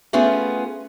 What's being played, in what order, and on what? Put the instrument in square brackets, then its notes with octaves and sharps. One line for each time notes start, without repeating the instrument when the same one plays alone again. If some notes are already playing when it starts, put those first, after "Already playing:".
[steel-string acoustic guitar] A3 B3 C#4 F4 G#4